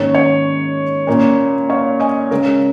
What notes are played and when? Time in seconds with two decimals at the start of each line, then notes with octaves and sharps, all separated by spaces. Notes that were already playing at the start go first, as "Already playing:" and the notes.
Already playing: G#2 D#3 A#3 C#4 C#5
0.15 C#5
1.07 A#2 A#3 C#4
1.70 C#5 F5
2.00 D#5 G#5
2.31 C#3 G#3 C#4 A#4